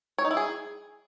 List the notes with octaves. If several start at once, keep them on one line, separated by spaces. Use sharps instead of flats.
C#5
D#4
E4
G#4